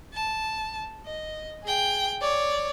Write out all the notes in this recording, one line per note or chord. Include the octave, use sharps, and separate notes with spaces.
A5
D#5
G#4 G5
C#5 D5